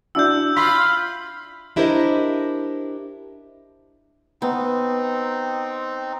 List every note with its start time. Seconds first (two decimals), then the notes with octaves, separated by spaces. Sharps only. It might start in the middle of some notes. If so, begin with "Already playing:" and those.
0.15 D4 E4 F#4 E6 G6
0.57 F4 B5 B6
1.76 D4 E4 G4 A#4 C5 D#5
4.42 B3 C4 D#4